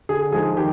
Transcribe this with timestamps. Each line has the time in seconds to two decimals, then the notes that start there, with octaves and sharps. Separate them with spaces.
0.09 D3 G#4
0.32 F3 G#3 D#4 G#4
0.57 D#3 G4